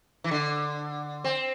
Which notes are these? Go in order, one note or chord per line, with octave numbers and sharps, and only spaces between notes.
E3
D3
C4